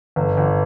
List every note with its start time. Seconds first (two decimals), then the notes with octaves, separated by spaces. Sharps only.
0.16 G1
0.37 G1